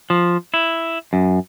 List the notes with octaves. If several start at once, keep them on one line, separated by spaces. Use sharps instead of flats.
F3
E4
F#2